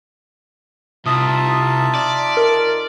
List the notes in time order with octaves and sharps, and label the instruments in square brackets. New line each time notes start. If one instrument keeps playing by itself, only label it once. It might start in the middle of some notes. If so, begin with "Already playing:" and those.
[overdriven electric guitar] C2 [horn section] D#4 F4 [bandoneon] E5 A5 [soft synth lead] D#6
[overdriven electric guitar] D5
[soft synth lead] A#4